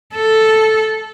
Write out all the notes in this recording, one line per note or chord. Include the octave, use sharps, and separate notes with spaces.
A4